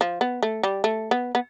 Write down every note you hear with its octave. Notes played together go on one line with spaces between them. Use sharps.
F3
B3
A3
G3
A3
B3
B3